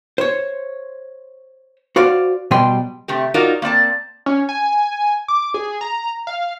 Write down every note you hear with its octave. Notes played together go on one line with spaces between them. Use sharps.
C5 C#5
F#4 C5 D5 F5
B2 F#3 G3 D#5 G5 C6
C3 A3 G4
D#4 F4 F#4 A#4 D5 D#5
A#3 C4 D5 A5
C#4
G#5
D6
G#4
A#5
F5